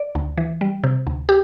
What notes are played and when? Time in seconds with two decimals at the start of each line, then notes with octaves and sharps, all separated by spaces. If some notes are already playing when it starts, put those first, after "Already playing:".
Already playing: D5
0.15 D2
0.37 E3
0.61 G3
0.84 C3
1.07 D2
1.29 G4